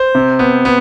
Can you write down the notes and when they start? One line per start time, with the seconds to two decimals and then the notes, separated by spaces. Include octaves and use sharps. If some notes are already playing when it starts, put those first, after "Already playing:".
Already playing: C5
0.15 C3
0.39 B3
0.65 B3